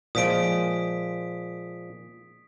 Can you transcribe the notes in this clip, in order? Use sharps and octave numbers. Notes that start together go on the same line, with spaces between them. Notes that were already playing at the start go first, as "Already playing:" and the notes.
A#2 F3 G#3 D#6 B6 D7